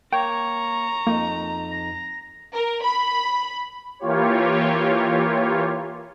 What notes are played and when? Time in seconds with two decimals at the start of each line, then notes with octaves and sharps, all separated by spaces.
0.13 A#3 C#5 G5 A#5 C#6
1.07 F2 A#3 D#4
1.71 A#6
2.55 A#4
2.84 B5
3.99 E3 A#3 F4 G4 C#5